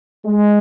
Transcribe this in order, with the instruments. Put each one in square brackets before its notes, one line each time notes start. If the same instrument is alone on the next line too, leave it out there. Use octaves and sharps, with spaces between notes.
[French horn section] G#3